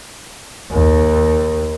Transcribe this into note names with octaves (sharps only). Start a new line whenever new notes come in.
D#2